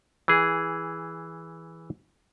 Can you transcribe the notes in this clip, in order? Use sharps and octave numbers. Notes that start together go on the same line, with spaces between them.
E3 G#4